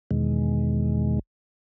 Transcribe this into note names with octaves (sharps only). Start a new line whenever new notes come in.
E2 B2 D#3 G#3